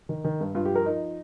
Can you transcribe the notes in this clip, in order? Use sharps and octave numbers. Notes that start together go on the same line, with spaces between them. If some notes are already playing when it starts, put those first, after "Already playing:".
D#3
D#3
G2
G2 F4
F3 G4
A#4
F3 D#4